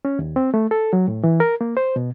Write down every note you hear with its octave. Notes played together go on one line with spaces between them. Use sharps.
C#4
D#2
C4
A3
A4
F#3
A2
E3
A#4
A#3
C5
B2